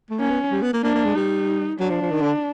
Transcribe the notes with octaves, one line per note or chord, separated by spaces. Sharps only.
A3
A#3 C#4
B3
G3
B3
A#3
A#3 D4
A#3
G#3
G3 D#4
F#3 D4
F3
F3
D#3
D3